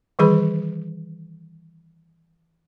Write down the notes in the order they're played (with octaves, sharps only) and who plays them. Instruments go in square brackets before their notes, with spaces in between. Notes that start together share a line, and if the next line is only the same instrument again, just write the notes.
[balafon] D#3 E3 G3 G#4 B4 B5